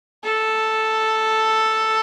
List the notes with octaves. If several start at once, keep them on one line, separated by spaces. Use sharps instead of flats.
A4